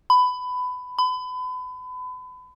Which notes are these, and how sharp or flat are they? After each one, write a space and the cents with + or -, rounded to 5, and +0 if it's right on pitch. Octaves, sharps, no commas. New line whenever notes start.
B5 +20
B5 +35